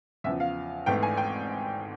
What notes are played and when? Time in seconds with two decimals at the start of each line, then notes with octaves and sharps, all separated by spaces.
0.24 E2 C#3 F3 E5
0.40 F5
0.86 G#1 G#2 E3 A3 G5
1.03 G#5
1.17 G5